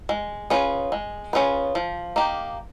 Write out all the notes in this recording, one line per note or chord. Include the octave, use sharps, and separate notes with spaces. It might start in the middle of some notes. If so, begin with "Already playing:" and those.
G#3
C#4 F4 G#4 B4
G#3
C#4 F4 G#4 B4
F3
A#3 D#4 G4